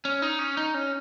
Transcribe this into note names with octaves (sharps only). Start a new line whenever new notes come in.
C#4
D#4
C#4
D#4
C#4